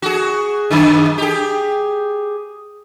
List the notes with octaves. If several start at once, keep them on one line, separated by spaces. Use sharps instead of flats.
F#4 G#4
F#2 D#3 G#4
G4 G#4